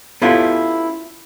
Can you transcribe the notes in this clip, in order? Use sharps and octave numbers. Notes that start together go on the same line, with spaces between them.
B3 C#4 E4 F4 G4 A4